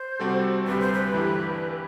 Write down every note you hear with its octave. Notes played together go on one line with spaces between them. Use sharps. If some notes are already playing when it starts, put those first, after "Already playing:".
Already playing: C5
C3 G3 C4 F#4 A4
D2 C3 G3 B4
C5
B4
G2 E3 A3 E4 G4